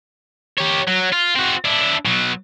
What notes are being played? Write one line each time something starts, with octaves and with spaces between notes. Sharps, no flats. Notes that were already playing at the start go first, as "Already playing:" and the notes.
G4 C#5
F#3
F4
C4 F#4
D4 E4
B2 F#3